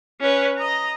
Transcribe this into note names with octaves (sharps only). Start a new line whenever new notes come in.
C#4 B4
D#5 A#5